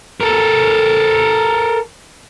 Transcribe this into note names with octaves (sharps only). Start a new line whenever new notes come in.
A4 A#4